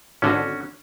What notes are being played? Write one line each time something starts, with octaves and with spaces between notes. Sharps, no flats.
G#1 D3 C#4 F#4